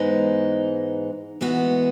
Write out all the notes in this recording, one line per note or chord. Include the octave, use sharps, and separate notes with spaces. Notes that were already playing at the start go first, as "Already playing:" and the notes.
Already playing: G#2 E3 G#3 B3 D#4
E3 G#3 B3 F#4